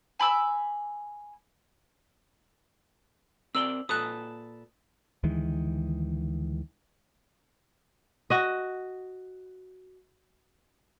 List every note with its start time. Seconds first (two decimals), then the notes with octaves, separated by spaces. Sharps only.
0.19 G#5 B5 D6 E6
3.55 C4 A#4 D5 E6 F#7 G7
3.89 A#2 A4 B4 D#6 F#6
5.23 D2 D#3 E3 G#3
8.30 F#4 D#5